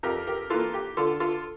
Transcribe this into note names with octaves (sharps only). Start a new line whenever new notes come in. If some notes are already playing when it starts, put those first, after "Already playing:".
F2 G4 A#4
G4 A#4
E3 A#3 F4 A4
G4
D3 F4 A4
F4 A4